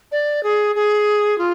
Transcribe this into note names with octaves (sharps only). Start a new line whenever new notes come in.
D5
G#4
G#4
F4